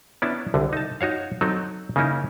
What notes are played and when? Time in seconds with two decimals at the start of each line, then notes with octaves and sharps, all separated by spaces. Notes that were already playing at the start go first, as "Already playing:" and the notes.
0.22 B3 C#4 D4 E4 A5
0.54 C2 D3
0.73 D#4 A5
1.01 D#4 F#4 C#5 F5
1.41 F#3 C4 D#4 A4
1.96 C#3 A#3 C#4 D#4 E4